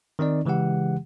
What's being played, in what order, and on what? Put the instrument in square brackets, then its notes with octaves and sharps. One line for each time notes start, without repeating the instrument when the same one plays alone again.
[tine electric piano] D#3 C4 D#4 D5
C#3 E3 G#3 G4 F#5